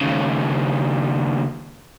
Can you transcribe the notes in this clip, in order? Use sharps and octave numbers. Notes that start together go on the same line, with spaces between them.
D#2 C#3